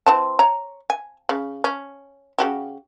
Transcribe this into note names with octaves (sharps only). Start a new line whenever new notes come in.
E3 C4 A5
C#5 A#5
G#5
C#3
C#4
C#3 F#4 G4